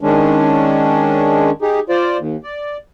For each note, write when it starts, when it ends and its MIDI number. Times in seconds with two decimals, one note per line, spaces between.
0.01 1.50 51
0.01 1.50 56
0.01 1.50 61
0.01 1.50 62
1.62 1.80 63
1.62 1.80 67
1.62 1.80 68
1.89 2.17 65
1.89 2.17 72
1.89 2.17 74
2.18 2.36 39
2.43 2.77 74